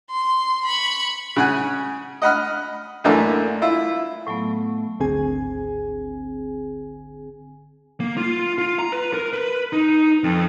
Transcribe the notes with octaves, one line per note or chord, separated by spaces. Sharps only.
C6
B5 C#6
C#3 F#5 G#5
D#5 F#5 B5 F6
F#2 D3 E3 A3 A#3 D4
E4 F4
A2 F#3 A3 B3
G#1 D2 D3 C4 G#4 G#5
A#3
F4
F4
A#5
B4
A#4
B4
D#4
F2